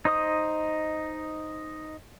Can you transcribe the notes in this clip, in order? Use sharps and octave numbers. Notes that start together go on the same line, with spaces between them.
D#4 C5 D#5 D#6